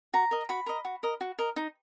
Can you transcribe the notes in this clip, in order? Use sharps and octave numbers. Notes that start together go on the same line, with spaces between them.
F#4 A#5
A#4 D#5
F#4 B5
A#4 D#5
F#4
A#4 D#5
F#4
A#4 D#5
D#4